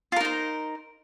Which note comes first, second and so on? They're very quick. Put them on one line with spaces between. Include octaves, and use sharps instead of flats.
F4 A#4 D#4 C5